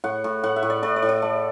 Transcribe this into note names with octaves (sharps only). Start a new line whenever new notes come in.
A2 F#5
A2
A2 F#5
E5
A2
D5
A2 D5
D5
A2
D5
A3